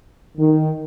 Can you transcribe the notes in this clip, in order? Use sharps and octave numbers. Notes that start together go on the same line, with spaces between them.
D#3